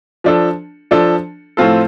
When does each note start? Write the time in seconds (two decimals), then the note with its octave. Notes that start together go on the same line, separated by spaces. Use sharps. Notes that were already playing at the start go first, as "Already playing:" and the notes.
0.24 F3 D4 A4
0.91 F3 D4 A4
1.57 A2 F3 C4 F4 A4